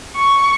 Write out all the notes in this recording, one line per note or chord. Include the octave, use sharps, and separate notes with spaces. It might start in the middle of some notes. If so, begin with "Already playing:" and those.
C#6